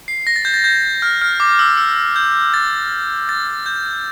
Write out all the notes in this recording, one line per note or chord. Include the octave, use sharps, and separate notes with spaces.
C7
A#6
A6
G6
A6
G6
F6
F6
D6
E6
E6
G6
A6
A6
G6